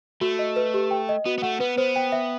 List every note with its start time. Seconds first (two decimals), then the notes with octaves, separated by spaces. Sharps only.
0.21 A3 F#4
0.39 D#5
0.56 B4
0.74 G4
0.91 G5
1.09 D#5
1.25 B3 F#4
1.38 B3
1.42 A3 F#5
1.60 B3 B4
1.78 B3 C5
1.96 G5
2.12 E5